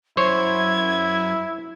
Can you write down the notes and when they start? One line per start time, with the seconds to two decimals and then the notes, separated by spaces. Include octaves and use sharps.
0.17 F#2 E4 C5 C#5 G#6